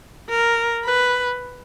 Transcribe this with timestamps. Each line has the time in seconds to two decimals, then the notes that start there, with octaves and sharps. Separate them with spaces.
0.30 A#4
0.84 B4